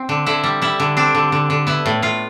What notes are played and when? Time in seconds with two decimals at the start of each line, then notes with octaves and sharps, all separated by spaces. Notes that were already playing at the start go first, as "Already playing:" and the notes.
Already playing: C4
0.09 D3
0.26 D3 E4
0.44 G3
0.62 G3 E4
0.80 D3
0.97 C4 D4
1.15 D3
1.32 D3
1.50 D3
1.67 B3 E4
1.86 A2
2.02 A2 F4